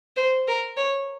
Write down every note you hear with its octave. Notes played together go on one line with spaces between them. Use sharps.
C5
A#4
C#5